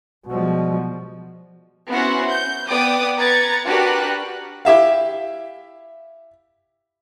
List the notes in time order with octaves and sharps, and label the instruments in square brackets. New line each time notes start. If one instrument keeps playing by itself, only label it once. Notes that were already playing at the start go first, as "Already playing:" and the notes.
[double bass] B2 F3 [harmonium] G3 G#3 F#4
[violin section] B3 C#4 E4 F#4 C5 F#5
G6
B3 D5 G5 D6 D#6
B4 A#5 G#6 A6 C#7
D4 F#4 G4 A#4 B4 F#6
[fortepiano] E4 G4 E5 F5